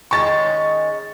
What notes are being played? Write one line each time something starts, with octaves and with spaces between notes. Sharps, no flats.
D#3 G#3 C#4 C#6 A6